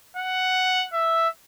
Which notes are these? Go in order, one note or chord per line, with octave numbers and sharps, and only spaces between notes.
F#5
E5